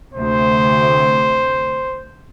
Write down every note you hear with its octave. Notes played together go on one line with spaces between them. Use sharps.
D2 C3 C5